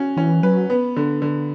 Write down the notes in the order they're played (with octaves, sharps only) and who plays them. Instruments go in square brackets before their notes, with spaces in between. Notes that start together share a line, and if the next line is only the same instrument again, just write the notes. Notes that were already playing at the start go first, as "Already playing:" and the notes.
Already playing: [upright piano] C#4 F#4
[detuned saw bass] E3 [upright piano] C#4
[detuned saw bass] F#3 [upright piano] B4
[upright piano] B3
D3
D3